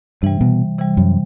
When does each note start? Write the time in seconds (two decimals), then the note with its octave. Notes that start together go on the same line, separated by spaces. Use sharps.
0.22 G2 C3 E3 G3
0.41 B2
0.78 C3 E3 G3
0.97 F#2